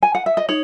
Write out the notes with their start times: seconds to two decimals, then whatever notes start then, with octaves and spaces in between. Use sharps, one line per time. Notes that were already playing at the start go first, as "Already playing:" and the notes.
0.03 G#5
0.15 F#5
0.26 E5
0.37 D#5
0.49 D#4 C#5